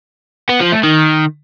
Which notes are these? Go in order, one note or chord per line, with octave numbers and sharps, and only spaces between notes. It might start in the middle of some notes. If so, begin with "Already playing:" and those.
B3
F3
A3
D#3